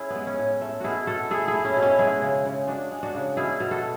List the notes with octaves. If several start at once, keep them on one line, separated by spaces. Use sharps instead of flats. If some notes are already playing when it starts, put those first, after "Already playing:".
Already playing: C#4 E4 G#4
B3
G#3
C#4
A2
A3
B2 E4 F#4 G#4
B2 F#4 A4
A3 E4 G#4
E4 G#4
A3
C#4 E4
B2
C#4 E4
G#3 E4 G#4
C#3
C#3
G#3 D4 F#4
G#3
D4 F#4
C#3
B2 E4 G#4
B2
F#4 A4